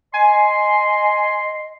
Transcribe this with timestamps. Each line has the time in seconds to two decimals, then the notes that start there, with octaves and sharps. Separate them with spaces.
0.14 D#5 G#5 C6